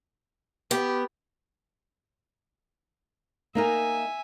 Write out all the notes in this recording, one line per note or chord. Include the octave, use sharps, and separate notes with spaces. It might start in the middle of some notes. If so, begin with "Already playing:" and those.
B3 G4
A#3 D#4 A#4 E5 G#5